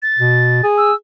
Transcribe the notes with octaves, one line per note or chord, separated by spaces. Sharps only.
A6
B2
G#4
E6